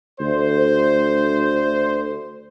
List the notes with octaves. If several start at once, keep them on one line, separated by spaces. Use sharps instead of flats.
D2 C5